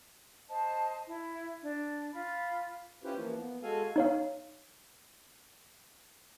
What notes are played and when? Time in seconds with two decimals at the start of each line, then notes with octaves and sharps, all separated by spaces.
0.48 C5 D#5 A5
1.06 E4
1.62 D4
2.13 F4 B5
3.04 C#4 E4 F4 G4 B4 C5
3.18 E3 F3 A#3
3.37 B3
3.63 G#3 F#4 A4 F5 G#5
3.96 D#4 C#5 F5